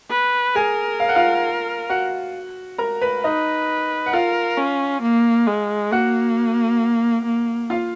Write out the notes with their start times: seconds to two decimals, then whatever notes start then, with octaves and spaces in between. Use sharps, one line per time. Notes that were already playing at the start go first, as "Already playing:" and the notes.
0.10 B4
0.55 G#4 A#4 G#5
1.00 F5
1.09 F#5
1.15 F4 F5
1.89 F#4 F#5
2.78 A#4 A#5
3.02 B4 B5
3.24 D#4 B4 D#5
4.06 F#5
4.13 F4 A#4 F5
4.58 C#4
5.02 A#3
5.47 G#3
5.92 A#3 F#4 F#5
7.26 A#3
7.70 F4 F5